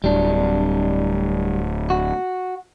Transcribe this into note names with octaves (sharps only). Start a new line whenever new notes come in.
D1 G3 D4
F#4